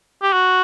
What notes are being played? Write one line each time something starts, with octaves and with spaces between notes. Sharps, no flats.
G4
F#4